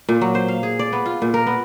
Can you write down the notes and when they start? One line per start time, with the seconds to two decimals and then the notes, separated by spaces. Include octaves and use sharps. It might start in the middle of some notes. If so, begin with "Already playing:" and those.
0.09 A#2
0.21 F#3
0.35 C5
0.48 F5
0.63 G#4
0.79 D5
0.93 B3
1.06 F4
1.22 A#2
1.34 A#4
1.47 B3